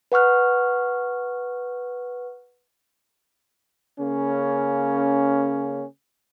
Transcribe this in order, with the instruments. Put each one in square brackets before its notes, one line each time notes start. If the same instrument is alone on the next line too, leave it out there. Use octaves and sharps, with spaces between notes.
[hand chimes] B4 F#5 C#6 F6 F#6
[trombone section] C#3 A#3 C#4